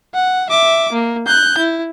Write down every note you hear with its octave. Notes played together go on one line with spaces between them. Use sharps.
F#5
E5 D6
A#3
F#6 G6
E4